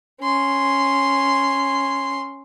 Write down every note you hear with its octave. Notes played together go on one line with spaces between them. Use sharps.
C#4 C6